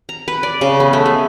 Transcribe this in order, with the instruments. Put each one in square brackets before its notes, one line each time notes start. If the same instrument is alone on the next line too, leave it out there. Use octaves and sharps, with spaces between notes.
[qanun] A#5
B4
D5
C#3
B3
A3
G#3